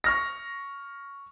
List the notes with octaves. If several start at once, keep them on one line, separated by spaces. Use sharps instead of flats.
C#6 F6 A#6